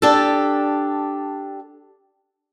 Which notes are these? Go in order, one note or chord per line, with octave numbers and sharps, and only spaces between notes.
D4 G4 A4